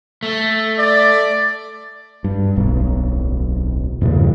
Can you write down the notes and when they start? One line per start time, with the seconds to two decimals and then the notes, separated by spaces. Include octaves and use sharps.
0.23 A3
0.79 D5
2.24 G2
2.55 D1 B1
4.01 E2 G2 A#2 C#3